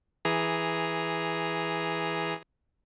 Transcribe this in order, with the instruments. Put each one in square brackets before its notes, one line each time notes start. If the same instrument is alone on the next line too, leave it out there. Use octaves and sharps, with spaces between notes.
[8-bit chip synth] E3 G#4 A#5